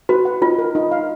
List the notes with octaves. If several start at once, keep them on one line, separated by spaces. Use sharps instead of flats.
F#4 B4
F#5
D#4 F4
A#4
D#4
F5